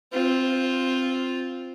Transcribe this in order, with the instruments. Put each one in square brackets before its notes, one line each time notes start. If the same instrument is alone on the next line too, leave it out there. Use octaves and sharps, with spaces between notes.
[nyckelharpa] C4 F4